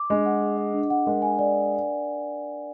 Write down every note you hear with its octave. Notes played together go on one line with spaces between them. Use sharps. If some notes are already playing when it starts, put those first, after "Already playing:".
Already playing: D6
G#3 D4
F#5
G#4
D#5
D4
F#5
G#3 A#4
G#5
D5